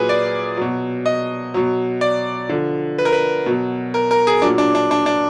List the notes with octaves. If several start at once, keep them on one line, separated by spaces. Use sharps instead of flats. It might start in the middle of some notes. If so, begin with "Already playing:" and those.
Already playing: A#2 F#3 G#4 B4
D5
B2 F#3
D#5
B2 F#3
D5
D3 F3
B4
A#4
B4
B2 F#3
A#4
A#4
G#4
A#2 F#3 D4
D4
D4
D4
D4